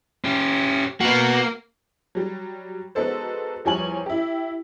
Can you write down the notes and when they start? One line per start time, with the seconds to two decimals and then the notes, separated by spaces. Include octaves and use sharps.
0.24 C#4 G4
1.01 A#3 B3 F#4
2.15 F#3 G3
2.95 G#3 B3 D#4 F#4 A4 C5
3.65 E2 F3 G3 C#5 G#5 F#7
4.06 E4 G4